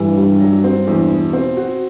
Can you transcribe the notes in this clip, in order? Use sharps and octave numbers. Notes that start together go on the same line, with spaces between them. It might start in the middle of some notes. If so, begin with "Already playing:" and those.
Already playing: G2 E3
G3
F#3
C4
E2
B2
C4
F#4